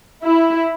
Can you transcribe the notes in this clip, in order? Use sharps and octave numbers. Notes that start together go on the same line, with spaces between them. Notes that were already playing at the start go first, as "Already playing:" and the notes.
E4